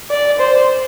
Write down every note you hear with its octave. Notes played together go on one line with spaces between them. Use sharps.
D5
C5